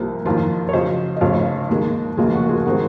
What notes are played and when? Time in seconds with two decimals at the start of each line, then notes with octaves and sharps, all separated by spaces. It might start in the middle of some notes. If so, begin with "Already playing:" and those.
Already playing: C2 C3 F3 A#3
0.25 F#1 F2 D#3 F4
0.69 C#5
0.73 F2 C#3 F#3 C5 D#5
1.17 D#5
1.21 F1 F2 C#3 F3 C#5 F5
1.69 D#2 D#3 G#3
2.17 F1 D#2 C#3 F#3 A#3 F4 G#4
2.33 F#4
2.49 F4 G#4
2.66 D#3 G#3 C4 F#4